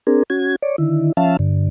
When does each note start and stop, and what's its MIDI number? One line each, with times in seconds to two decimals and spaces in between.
0.07 0.23 60
0.07 0.23 62
0.07 0.23 68
0.07 0.23 70
0.30 0.56 61
0.30 0.56 66
0.30 0.56 92
0.62 0.76 73
0.62 0.76 74
0.78 1.12 50
0.78 1.12 51
0.78 1.12 64
1.17 1.37 53
1.17 1.37 61
1.17 1.37 76
1.17 1.37 77
1.17 1.37 81
1.39 1.69 43
1.39 1.69 50